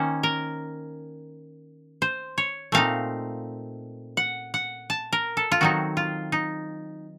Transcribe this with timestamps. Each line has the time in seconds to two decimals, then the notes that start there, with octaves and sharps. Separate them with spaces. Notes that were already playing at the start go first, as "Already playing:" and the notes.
Already playing: D#3 A#3 C#4 C5
0.23 A#4
2.02 C5
2.38 C#5
2.72 A#2 A3 C4 D#4 F5
4.17 F#5
4.54 F#5
4.90 A5
5.13 A#4
5.37 A4
5.52 F4
5.61 D#3 F#3 C4 D#4 F#4
5.97 F4
6.32 D#4